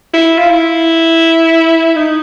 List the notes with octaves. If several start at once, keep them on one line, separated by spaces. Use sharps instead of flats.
E4
F4
E4
D#4